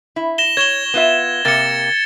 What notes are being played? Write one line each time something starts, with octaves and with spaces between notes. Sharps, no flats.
E4
A#6 E7 G7
C#5 G#6 E7 G7
B3 F4 E5
C3 A#3 A6 C#7